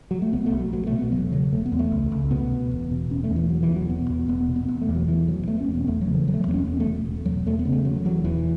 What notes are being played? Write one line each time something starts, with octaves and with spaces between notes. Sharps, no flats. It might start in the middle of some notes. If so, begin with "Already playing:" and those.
F#3
A3
B1 B3
A3
B1
F#3
B2 F#3
A3
B2
B3
E1 F#3
C#3 F#3
E1 A3
B3
E2
A3
C#2
C#2
B2 B3
B2
E1
B2
E1 C#4
A3
E2
E3
E1 F#3
E3
B2
F#3
E1 B3
E2
E1 B3
B2
B3
E1 B3
A3
E2
F#3
E1 E3
B2 F#3
E1 A3
C#4
E2
B3
E1 A3
F#3
C#3
E3
E1 F#3
A3
F#3
E2 B3
C#4
E1 B3
A3
B2
E1
E2 F#3
E1 A3
B3
C#3
A3
E1 F#3
E2 F#3
E1 E3